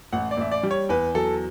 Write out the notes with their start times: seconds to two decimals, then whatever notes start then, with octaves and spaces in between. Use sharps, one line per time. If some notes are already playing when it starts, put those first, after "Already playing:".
0.12 A1 F#5
0.31 D5
0.37 A1 E5
0.51 D5
0.63 G3
0.71 C#5
0.89 E2 B4
1.14 F#3 A4